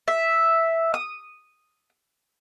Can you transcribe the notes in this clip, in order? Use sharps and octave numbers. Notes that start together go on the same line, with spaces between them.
E5
D#6